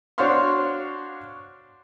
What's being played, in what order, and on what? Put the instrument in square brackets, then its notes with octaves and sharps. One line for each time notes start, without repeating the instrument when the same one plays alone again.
[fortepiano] D4 F#4 C5 C#5 F5 C6